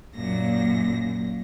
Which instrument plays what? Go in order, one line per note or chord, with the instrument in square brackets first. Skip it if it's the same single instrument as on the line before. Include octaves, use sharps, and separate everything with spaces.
[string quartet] F#2 A#2 A#6